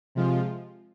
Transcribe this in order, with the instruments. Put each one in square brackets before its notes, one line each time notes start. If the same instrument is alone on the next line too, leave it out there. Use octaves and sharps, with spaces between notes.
[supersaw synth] C3 F3 G#3 F4